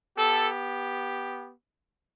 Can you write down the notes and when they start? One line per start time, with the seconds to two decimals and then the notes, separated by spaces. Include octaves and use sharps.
0.18 B3 G4 A4